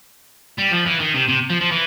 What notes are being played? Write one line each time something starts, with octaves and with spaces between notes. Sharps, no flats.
G3
F3
E3
D#3
C3
C3
F3
F3
E3